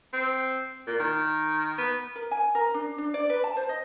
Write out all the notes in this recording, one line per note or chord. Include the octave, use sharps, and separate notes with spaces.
C4
A#2
D#3
B3
A#4
G#5
A#4
D4
D4
D5
B4
A5
C5
D#5